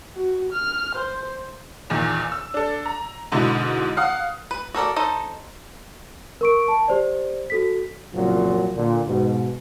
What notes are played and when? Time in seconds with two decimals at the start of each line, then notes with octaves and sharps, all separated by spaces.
0.16 F#4
0.52 F6
0.95 C5
1.90 E2 A#2 D#3
2.32 E6
2.54 D4 A4
2.86 A#5
3.32 G#2 B2 D3 E4
3.97 F5 F#5 D#6
4.51 B4
4.74 F#4 A4 A#4 D5
4.96 D#4 A4 C5
6.41 A#4 C#6 D7
6.68 A5
6.88 G4 C5 D5
7.50 F#4 A4 B6
8.14 C2 F#2 A#2 C#3 F3 F#3
8.75 A#2 D3
9.06 G#2 B2